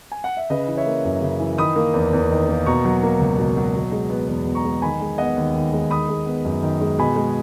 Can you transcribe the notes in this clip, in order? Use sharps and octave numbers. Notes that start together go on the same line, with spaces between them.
G#5
F#5
E5
C#3 B4 D#5
E3
C#5 E5
A#3
F#2
C#3
E3
D#3 B5 D#6
A#3
E2
E2
D#3
A#3
B2 A#5 C#6
F#3
A#3
C#2
B2
F#3
B2
G#3
B3
E2
B2
A#5 C#6
G#3
D#3 G#5 B5
G#3
B3 D#5 F#5
D#2
D#3
G#3
D#3 B5 D#6
G#3
B3
F#2
D#3
G#3
B2 G#5 B5
G#3